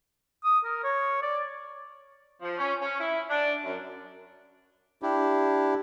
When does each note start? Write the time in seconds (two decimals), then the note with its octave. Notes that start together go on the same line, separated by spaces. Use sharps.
0.44 D#6
0.65 A#4
0.84 C#5
1.23 D5
2.42 F3
2.58 C#4
2.81 C#4
3.00 E4
3.30 D4
3.64 F#2
5.02 D4 E4 G4